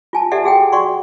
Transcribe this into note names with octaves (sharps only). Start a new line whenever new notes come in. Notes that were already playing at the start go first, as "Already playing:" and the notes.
F4 G#5 A5
G4 A4 D5 E5 F#5
F#4 G#4 F#5 G5
F#4 D5 F#5 C6 C#6